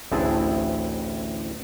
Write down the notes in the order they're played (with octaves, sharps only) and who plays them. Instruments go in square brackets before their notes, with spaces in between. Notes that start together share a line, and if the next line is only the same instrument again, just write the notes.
[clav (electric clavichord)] A1 D2 C4 E4 G#4 A5